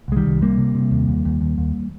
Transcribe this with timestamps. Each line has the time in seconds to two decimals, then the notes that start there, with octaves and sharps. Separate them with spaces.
0.08 C2 G#3
0.17 D#3 G3
0.26 C2
0.41 C3 G3 A#3
0.58 C3
0.75 C3
0.91 D#2
1.08 D#2
1.25 D#2
1.41 D#2
1.58 D#2